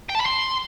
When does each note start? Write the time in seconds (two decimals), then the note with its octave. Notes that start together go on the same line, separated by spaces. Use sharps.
0.09 G5
0.15 A5
0.20 B5
0.26 C6